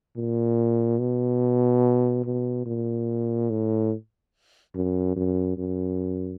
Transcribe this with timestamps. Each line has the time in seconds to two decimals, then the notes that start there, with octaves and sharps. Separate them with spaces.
0.16 A#2
0.99 B2
2.25 B2
2.66 A#2
3.50 A2
4.75 F#2
5.16 F#2
5.58 F#2